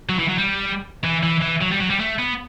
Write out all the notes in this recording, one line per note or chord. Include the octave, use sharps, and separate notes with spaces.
F#3
E3
F#3
G3
E3
E3
E3
F#3
G3
F#3
G3
A3
B3